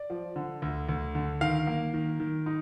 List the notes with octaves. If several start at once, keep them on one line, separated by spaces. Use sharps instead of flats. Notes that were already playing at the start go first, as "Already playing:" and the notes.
Already playing: D5
F3
D3
D2
D2
D3
D#3 F5
A#3
D#3
D#3
D#4